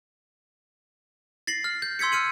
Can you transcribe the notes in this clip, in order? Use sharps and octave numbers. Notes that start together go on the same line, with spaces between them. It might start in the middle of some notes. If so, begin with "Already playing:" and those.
A6 A#6 C7 F#7
F6
G6
C6 E6 G#6 B6 C#7
F6 C#7 D#7 F#7